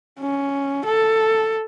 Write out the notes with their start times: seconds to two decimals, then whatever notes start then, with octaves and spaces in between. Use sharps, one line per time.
0.20 C#4
0.86 A4